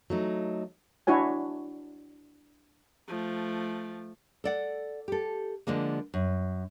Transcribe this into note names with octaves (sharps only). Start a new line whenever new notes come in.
F#3 A3 D#4
D4 E4 F#4 C#5 G#5
F3 A3
A4 D5 F#5
G4 A4
D3 F3 G#3 A#3
F#2